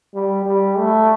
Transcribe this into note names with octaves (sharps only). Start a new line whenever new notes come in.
G3
G3
A3